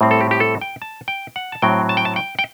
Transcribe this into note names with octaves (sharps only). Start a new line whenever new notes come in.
A2 G3 C4
A4
G4
G4
A4
G5
A5
G5
F#5
A5
A2 F#3 C4 G5
A5
G5
A5
G5
G5